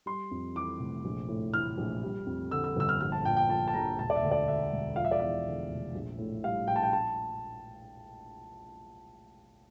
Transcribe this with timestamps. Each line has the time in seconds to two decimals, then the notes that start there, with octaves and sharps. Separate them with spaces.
0.06 G3 C6
0.31 F2
0.55 E3 D6
0.79 F1
1.04 A#1
1.28 A2
1.54 E3 F6
1.77 A#1
2.03 G3
2.26 F2
2.51 D3 E6
2.64 E6
2.77 G1 E6
2.89 F6
3.01 A#1 F6
3.12 A5
3.24 A#2 G5
3.37 G5
3.49 F3 A5
3.68 A5
3.74 A#1 A#5
3.98 E1 A5
4.10 D5
4.15 E5
4.22 D2
4.31 D5
4.48 D3 E5
4.71 E1
4.96 F3 F5
5.05 E5
5.11 D5
5.19 E2 E5
5.46 D3
5.69 F1
5.95 A#1
6.18 A2
6.44 G3 F5
6.67 A#1 G5
6.76 A5
6.83 G5
6.93 A5